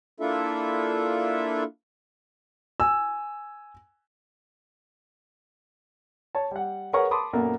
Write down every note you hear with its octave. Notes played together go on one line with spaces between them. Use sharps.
A#3 D4 E4 F4 A4 E5
G#5 E6
C#5 A5
G3 F#5
G#4 A#4 B4 C#5 F#5 C#6
A5 B5 C6 D6 D#6
F#2 A#2 A#3 B3 A4 A#4